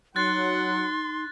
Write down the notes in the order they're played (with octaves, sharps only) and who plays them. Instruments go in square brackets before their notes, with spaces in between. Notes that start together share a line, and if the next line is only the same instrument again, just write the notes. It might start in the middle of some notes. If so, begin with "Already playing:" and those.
[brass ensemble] F#3 F#5 [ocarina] D#4 [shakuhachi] C6 [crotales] F#6 A6